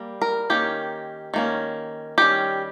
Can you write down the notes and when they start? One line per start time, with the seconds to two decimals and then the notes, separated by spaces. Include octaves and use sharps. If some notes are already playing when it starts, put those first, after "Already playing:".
Already playing: G3 A#3
0.22 A#4
0.50 D#3 A#3 C#4 G4
1.34 D#3 A#3 C#4
2.18 D#3 G3 C#4 G4